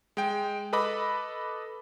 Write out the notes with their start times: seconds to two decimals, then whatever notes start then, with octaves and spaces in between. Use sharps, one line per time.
0.17 G#3 G5
0.73 A4 B4 D#5 B5 D6